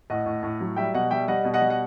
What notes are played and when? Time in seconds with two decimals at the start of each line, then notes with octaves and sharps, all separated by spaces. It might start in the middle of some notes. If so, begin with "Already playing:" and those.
0.10 A2 D#5 F#5
0.26 A2
0.43 A2
0.60 F#3
0.76 G3 E5 G5
0.94 B2 D#5 F#5
1.11 G3 E5 G5
1.28 G3 D#5 F#5
1.44 B2
1.54 D#5 F#5
1.61 G3
1.70 F#5